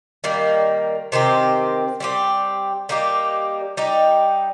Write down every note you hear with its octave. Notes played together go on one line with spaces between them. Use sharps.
D#3 G3 A#3
C3 D#3 C4 G4
G3 C4 G4
G3 A#3 D#4 G4
G3 D#4 G4